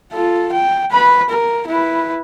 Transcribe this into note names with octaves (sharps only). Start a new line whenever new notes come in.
F4 A4
G5
B4 B5
A#4
E4 B4